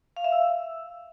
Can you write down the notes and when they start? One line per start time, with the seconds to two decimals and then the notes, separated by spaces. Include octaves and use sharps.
0.17 F5
0.24 E5
0.32 E6